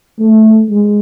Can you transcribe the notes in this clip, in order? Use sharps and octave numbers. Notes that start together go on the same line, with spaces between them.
A3
G#3